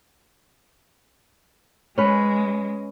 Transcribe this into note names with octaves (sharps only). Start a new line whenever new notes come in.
G#3 C#4 B4